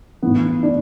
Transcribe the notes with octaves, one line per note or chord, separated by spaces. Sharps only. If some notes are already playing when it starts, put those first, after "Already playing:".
A2 E3 B3
D4